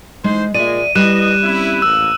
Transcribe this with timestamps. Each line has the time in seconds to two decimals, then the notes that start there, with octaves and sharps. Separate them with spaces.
0.24 E3 G#3 D#4 C5
0.55 A#2 G#3 D5 E5 D#7
0.95 G3 E4 B4 D#5 F#6 D#7 E7
1.43 C4 C#4 E4
1.82 A1 A#3 E6